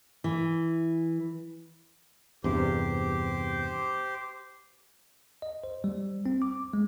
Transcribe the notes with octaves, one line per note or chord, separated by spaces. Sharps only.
E3
E2 G2 C3 G4 C5
D#5
C5
G3
C4
D6
G#3